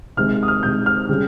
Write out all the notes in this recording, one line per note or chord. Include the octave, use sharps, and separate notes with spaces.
C3 D#3 G#3 F6
D#6
F6
C3 D#3 G#3 G6
F6
C#3 G3